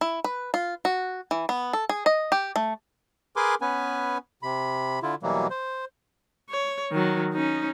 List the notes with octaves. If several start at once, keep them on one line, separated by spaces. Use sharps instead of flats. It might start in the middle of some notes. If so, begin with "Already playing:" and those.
E4
B4
F4
F#4
E3
B3
A4
G#4
D#5
G4
A3
G#4 A#4 B4 G#5 C6 D6
B3 C#4 B4 G#5
C3 B5
D3 E4 F4
B2 E3 F#3 G3 A#3
C5
C#5
D#3 F#3
C#4 D#4